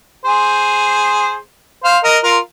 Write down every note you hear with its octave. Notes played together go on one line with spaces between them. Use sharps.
G#4 C5
C5 F5
A#4 D#5
F4 A#4